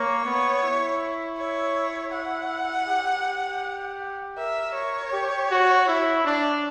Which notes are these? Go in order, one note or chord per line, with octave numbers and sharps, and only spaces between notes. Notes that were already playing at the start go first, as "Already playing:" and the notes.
Already playing: A#3 C#5
B3
E4
C#5
F#5
G4
A#4 E5
C#5
G4
F#4
E4
D4